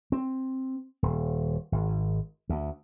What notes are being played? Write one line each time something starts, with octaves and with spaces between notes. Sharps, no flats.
C4
D#1
G#1
D2